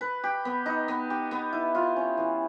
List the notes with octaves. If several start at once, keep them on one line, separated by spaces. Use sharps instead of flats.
B4
G4
B3
D#4
B3
G4
B3
E4
F4
C#4
E3